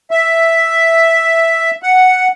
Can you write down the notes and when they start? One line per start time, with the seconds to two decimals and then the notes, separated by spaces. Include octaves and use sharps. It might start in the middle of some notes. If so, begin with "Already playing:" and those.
0.11 E5
1.83 F#5